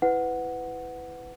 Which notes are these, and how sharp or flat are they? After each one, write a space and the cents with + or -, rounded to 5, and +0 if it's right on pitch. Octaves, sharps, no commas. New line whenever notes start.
E4 +0 B4 +20 F#5 +0